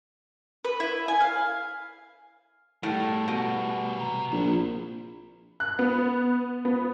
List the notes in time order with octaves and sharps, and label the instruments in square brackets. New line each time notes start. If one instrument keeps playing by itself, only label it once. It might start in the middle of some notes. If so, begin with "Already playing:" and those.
[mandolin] B4
E4
G#5
F5
[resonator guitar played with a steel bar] A2 [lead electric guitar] G3 A3
[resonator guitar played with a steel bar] B2
[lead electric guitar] C3 A#5
[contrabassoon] A#1 [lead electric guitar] C4 E4
[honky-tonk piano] F#6
B3
B3